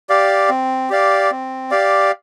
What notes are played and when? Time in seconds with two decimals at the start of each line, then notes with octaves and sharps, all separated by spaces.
0.09 G4 D5 F5
0.49 C4
0.90 G4 D5 F5
1.31 C4
1.71 G4 D5 F5